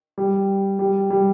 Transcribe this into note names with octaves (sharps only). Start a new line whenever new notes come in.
G3
G3
G3